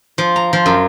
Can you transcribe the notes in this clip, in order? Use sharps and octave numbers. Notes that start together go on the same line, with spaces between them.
F3
A#5
F3
F#2